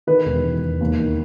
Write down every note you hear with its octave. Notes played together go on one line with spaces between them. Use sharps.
D#3 B4
E1
E1
E1
D#2
D#3